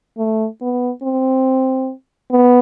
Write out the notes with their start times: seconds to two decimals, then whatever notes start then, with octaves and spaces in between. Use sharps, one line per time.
0.18 A3
0.61 B3
1.03 C4
2.31 B3